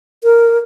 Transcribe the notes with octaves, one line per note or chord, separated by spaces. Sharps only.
A#4